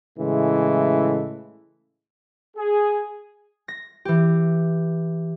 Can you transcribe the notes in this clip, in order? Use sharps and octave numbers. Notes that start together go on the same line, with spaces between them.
A2 C#3 E3 G#3 A3
G#4
A#6
E3 G4